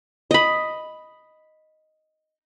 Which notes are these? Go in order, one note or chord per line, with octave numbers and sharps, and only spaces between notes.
D#5 B5